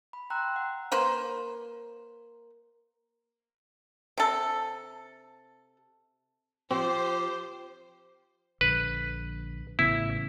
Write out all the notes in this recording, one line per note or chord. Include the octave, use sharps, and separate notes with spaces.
B5
G5 A#5 C6 E6 F#6
F#5
A#3 B4 C5
C3 A4
F3 C4 G4 C5
A#1 D3 B4
A1 C#3 B3 E4